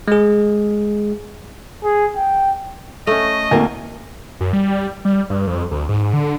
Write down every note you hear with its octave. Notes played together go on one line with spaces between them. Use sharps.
G#3 G#4
G#4
G5
A3 C#4 D#5
D2 A#3 A#4
F#2
G3
G3
G2
F2
D2
G#2
D3